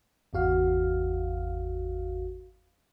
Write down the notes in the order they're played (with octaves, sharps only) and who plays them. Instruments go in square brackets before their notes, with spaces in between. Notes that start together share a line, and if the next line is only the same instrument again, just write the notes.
[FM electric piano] G#1 E2 F#4 F5